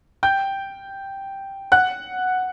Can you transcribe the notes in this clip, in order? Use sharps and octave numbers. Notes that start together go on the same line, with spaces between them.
G5 G6
F#5 F#6